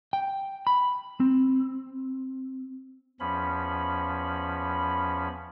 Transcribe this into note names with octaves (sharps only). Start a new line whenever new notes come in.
G5
B5
C4
E2 F3 C#4 B5